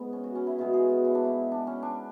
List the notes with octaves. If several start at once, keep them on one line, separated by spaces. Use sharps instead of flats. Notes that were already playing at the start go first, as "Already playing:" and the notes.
Already playing: G#2 G#3 B3 E4
C#4
F#4
C#4
E4
B2 G#3 F#4
G#4
F#4
E4
D4
E4
D4
C#4
D4